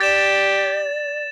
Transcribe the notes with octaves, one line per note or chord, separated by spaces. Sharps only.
G4 D5 A6 E7